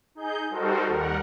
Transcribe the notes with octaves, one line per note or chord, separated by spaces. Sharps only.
D#4 G#4 G6
G3 D#4 F#4 A4 A#4 C5
D#2 G3 A#4 F#5